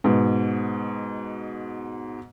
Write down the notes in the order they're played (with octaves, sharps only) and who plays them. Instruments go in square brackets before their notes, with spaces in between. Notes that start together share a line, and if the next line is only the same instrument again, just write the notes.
[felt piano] G#2 B2